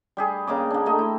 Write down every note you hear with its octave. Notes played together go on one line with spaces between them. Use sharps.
G3 G4 G#4
C#3 A#3 D#5 D6
A#3 D4
A3 D#4 G4 D#5
E4